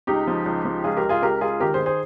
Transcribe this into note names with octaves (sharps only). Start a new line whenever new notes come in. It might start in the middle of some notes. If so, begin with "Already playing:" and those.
C#2 D#4 G4
F3
C#2
F3
C#2 F4 G#4
G4 A#4
C#2
F4 G#4
C#2 G4 A#4
C#2 F4 G#4
D#3 G4 A#4
G#4 C5
D#3
G#4 C5